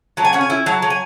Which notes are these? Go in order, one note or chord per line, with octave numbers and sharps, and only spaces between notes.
F#3 A5
G#5
C#4 F#5
G#5
E4
F#3 A5
F#3
G#5